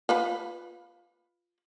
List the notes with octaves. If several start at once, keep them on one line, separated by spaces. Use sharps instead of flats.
F4 B4 B5